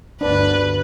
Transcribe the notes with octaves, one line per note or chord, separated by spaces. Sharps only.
G1 D2 D4 B4